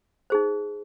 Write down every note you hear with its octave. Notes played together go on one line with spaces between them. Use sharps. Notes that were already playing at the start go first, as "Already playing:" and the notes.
D#4 G#4 C5